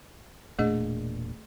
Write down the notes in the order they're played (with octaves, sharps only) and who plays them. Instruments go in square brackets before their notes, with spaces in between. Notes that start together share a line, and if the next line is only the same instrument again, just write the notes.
[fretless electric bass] E1 A#2 D4 [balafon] A3 G#4 D#5